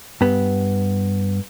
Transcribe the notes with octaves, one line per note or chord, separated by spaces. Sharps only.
G2 B3